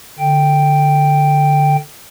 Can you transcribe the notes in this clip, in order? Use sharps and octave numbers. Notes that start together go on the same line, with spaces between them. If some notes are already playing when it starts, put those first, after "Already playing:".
D3 G5